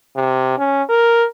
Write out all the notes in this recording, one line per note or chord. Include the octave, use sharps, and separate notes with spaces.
C3
C#4
A#4